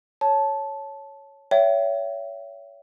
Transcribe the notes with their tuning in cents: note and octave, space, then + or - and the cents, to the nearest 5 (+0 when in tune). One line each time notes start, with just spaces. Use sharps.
C#5 +0 A5 -10
C#5 +30 E5 +25 G5 -35